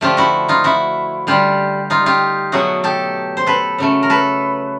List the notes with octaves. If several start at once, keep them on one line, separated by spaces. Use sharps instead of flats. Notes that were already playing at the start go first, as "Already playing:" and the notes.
D3 F3 A3 F4 G4
E4 F#4
D#4 F4
E4 F#4
D3 G3 F4 G4
D#4 F4
F4 G4
B2 F#3 A3 F#4 G#4
G4 A4
C5
A4 B4
C#3 F#3 A3
A#4
A4 B4